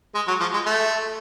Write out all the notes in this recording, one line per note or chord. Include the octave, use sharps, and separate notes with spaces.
G#3
F#3
F3
G#3
A3